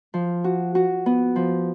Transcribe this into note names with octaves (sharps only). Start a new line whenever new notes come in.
F3
F#4
F#4
B3
F3